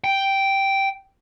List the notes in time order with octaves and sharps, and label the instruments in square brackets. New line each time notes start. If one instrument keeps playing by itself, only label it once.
[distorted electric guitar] G5